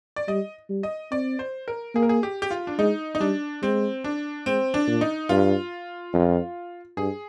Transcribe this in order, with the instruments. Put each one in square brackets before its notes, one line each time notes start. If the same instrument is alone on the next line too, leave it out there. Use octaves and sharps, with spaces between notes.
[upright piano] D5
[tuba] G3 [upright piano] D#5
[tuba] G3
[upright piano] D#5
[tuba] C4 [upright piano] D5
[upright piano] C5
A#4
[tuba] A#3 [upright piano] G#4
[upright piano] A#4
G#4
G4
G4
F4
D4
[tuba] G#3 [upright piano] D#4
[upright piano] D#4
[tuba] G3 [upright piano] D4
[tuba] G#3 [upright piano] C4
[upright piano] D4
[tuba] G#3 [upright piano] C4
[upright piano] D4
[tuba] A#2
[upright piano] D#4
[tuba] G2 [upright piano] F4
[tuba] F2
[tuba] G2 [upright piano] G#4